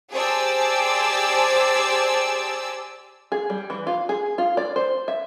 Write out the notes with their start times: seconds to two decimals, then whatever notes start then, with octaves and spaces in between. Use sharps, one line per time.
0.11 G4 G#4 C5 D5 A5 E6
3.32 G#4
3.50 G3
3.70 E3
3.87 F4
4.09 G#4
4.38 F4
4.57 D5
4.76 C5
5.08 E5